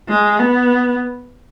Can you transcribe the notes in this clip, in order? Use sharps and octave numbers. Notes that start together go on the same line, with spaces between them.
G#3
B3